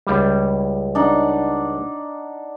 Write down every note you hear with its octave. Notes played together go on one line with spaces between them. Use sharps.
C#2 G3
D4 D#4 F#5